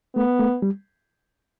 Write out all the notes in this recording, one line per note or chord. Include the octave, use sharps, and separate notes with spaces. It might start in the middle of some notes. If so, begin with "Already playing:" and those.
A3 B3
A3
G3